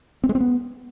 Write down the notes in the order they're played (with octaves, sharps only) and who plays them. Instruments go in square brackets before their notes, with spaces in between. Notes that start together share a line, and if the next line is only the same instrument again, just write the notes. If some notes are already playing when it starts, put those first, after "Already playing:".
[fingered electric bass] C4
G#3
C4
B3